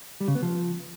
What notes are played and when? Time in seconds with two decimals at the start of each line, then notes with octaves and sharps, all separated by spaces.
0.20 G3
0.28 C#3
0.35 B3
0.42 F3